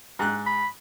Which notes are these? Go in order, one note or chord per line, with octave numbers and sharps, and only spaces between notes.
G#2 F#6
B5